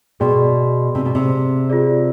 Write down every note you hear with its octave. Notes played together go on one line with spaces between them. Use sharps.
B2 G#4 D5 G5 C6
C3
B2
C3
F4 G#4 D5